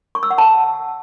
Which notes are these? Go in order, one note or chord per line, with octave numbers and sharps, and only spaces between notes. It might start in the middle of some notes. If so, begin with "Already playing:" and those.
C#6
E6
F#5
A5